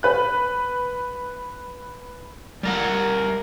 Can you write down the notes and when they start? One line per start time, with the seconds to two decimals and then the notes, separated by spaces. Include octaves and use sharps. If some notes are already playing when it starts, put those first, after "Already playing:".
0.03 B4 F#6
2.63 G3 A#4 F#5